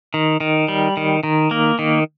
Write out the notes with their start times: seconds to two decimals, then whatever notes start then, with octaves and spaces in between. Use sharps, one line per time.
0.14 D#3
0.40 D#3
0.68 G3
0.97 D#3
1.23 D#3
1.51 A#3
1.79 D#3